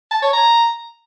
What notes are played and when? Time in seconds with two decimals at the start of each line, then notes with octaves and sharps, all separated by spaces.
0.11 A5
0.22 C#5
0.33 A#5